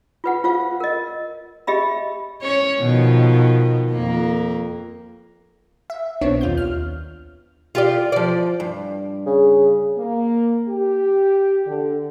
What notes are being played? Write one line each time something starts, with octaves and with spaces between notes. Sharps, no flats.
F4 B4 F#5
F4 C5 F5
A#4 D#5
G4 D#5 E5 B5
C#4 C#5
B2 D#3 F3
F2 A#3
E5
B1 B3 C4 D4 C#5
D#2 F4 G6
F6
F4 G4 D5
F3 D5
G2
C#3
A#3
G4
D3